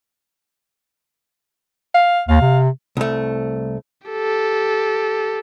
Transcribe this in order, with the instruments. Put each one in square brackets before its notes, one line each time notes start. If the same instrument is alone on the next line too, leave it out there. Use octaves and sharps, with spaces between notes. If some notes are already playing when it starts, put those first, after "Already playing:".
[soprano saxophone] F5
[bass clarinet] D#2 [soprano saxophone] F5
[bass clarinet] C3
[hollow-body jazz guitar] C2 A3
[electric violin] G4 A4